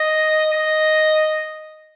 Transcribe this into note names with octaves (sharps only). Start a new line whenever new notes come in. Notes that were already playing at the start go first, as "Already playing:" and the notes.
Already playing: D#5
D#5